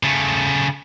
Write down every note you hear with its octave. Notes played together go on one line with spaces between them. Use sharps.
C#3 A3